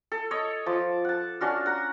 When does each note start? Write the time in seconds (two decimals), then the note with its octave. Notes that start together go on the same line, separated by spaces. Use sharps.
0.12 A4
0.31 C#5 D#5
0.66 F3 A5 D6
1.05 F#5 A5
1.41 C#4 D4 F#4 F5
1.66 F#5 A#5